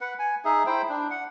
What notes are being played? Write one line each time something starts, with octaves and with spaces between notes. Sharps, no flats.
B4 F#5
G#5
D#4 G#4 E5
E4 C5 G5
D4
F#5